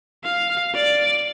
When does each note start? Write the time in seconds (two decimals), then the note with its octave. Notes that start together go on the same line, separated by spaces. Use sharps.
0.24 F5
0.74 D5